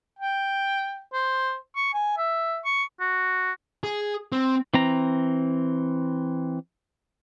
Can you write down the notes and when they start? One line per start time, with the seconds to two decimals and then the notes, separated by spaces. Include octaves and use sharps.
0.19 G5
1.13 C5
1.76 C#6
1.93 G#5
2.17 E5
2.64 C#6
3.00 F#4
3.84 G#4
4.32 C4
4.74 E3 C4 A#5